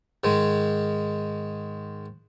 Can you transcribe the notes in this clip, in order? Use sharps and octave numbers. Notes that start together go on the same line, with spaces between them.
G#2 D#3 G#3